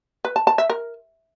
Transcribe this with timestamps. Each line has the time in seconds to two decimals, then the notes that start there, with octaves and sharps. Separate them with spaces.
0.25 B4
0.36 A5
0.47 A5
0.58 E5
0.70 A#4